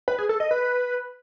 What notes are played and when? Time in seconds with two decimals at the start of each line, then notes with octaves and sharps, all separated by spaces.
0.08 B4
0.18 G#4
0.29 A4
0.40 D#5
0.51 B4